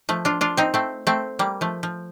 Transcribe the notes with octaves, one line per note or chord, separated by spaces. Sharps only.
F3 A3
D4 F4
D4 F4
C4 D#4
A3 C4
A3 C4
G3 A#3
F3 A3
F3